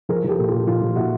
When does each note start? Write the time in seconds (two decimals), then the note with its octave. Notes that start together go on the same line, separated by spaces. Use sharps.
0.09 F3 G#4 A#4
0.24 F3 G4 A4
0.39 A#2
0.48 F4 G4
0.53 A#2
0.67 F3 F4
0.82 F3
0.96 A#2 E4 F#4